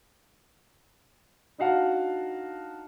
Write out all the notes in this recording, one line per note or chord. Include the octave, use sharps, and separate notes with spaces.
D4 D#4 F#4 F5 F#5 A5